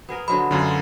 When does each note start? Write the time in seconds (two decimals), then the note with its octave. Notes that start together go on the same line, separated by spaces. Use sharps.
0.09 B3 G#4 A#4
0.28 D3 F#3 G#3 B5
0.51 F#2 D3 F4